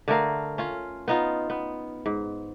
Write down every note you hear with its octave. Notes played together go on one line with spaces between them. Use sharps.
D3 A3 A#4 F5
C#4 F4
B3 D#4 F4
B3
G#2